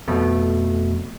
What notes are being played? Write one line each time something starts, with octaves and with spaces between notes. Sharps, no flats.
F2 B2 A3